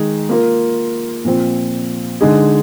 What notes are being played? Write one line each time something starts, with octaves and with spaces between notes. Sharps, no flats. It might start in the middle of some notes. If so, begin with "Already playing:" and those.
Already playing: D#3 G#3 D#4 G#4
A#3 F4 A#4
A#2 F3 C4
D3 G#3 D#4 G#4